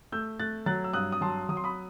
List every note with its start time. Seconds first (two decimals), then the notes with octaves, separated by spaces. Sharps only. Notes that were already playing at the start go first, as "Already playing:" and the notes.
0.12 A3 E6 G6
0.39 A3 F#6 A6
0.66 F#3 F#6 A6
0.84 E6
0.93 G2 D#6 F#6
1.12 D#6
1.21 F#3 A5 C6
1.49 F#3 D#6
1.57 C6
1.64 B5 D#6